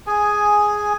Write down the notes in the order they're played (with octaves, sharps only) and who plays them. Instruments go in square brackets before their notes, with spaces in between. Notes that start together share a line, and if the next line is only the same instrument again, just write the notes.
[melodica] G#4 G#5